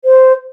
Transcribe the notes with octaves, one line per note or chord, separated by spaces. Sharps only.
C5